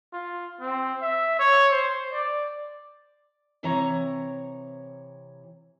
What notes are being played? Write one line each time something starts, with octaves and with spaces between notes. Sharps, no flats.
F4
C4
E5
C#5
C5
D5
C3 E3 C#5 A#5